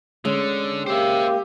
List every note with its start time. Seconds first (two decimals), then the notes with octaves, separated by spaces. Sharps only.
0.25 D3 G#3 C#4
0.87 A#3 G4 C5 E5